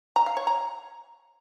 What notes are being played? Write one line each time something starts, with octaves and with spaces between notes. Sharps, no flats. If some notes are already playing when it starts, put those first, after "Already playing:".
A#5
F5
C#5
A#5